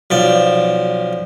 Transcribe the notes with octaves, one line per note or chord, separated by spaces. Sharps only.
B1 F3 D5